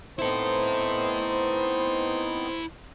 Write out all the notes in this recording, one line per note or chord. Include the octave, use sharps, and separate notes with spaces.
B3 C4 D#4 E4 A4 C5